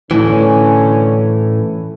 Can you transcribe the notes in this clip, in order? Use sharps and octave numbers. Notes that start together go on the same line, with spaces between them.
A2 D3 E3 C#4